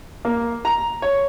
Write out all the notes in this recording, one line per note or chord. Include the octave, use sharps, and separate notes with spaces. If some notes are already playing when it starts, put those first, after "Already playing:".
A#3
A#5
C#5